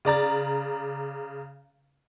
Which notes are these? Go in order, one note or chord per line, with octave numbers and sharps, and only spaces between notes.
C#3 D5 A#5 A6